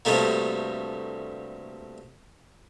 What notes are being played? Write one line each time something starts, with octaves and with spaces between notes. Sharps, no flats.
D2 G2 C3 G3 A3 A#3